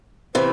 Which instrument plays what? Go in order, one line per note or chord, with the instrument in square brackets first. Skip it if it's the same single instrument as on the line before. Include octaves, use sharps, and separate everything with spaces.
[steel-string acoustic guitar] C3 E3 [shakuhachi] C5